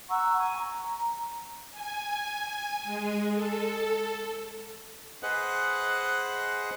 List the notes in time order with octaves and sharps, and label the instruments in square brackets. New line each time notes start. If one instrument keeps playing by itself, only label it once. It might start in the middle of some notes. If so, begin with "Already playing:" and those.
[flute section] F#5 A#5 C#6 E6
G#5 C#6
A#5
[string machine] G#5
G#3
A4
[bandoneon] G#4 B4 C5 D#5 F#5 F#6